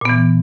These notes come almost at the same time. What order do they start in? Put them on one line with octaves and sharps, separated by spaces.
A#2 B3 E3